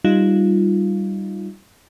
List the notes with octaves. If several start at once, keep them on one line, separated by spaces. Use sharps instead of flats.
G3 D#4 F4